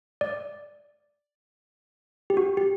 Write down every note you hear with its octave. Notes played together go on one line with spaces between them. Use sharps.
D5
G4
F#4
G4